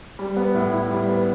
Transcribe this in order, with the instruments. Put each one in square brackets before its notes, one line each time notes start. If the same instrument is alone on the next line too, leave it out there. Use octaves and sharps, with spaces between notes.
[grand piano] G3
B3
A2
E4
G3
B3